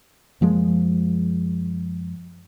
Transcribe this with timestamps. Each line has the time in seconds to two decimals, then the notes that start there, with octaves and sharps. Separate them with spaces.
0.41 F#2 F3 G#3 A#3